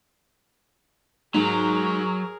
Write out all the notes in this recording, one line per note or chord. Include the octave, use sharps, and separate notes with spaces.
G#2 F#3 G#4 A#4